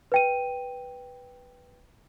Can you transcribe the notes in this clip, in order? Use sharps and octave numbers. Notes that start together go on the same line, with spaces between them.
B4 G5 D#7